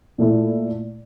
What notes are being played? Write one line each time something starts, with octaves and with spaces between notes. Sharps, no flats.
A#2 A3 E4